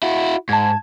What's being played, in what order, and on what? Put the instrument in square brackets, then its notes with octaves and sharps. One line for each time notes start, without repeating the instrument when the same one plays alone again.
[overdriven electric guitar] E4 F#4
[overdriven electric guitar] G#2 [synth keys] A5 G#6